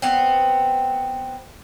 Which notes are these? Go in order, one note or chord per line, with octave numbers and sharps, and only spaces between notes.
B3 C4